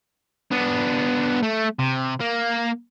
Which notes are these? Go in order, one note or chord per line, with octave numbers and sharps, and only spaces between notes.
B3 D4
A3
C3
A#3